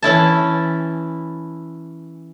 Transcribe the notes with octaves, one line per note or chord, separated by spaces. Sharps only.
E3 C#4 E4 A5